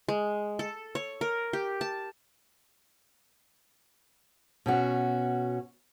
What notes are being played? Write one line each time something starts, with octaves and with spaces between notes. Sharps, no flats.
G#3
A4
C#5
A#4
G4
A5
B2 C#4 F#4